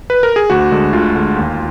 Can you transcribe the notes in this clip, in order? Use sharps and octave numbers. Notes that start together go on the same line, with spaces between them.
B4
A#4
G#4
D2 F#4
D3 G#3
D2 F4
D3 G#3
D#2